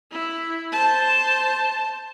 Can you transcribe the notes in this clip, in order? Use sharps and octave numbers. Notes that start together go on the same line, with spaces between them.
E4
C5 A5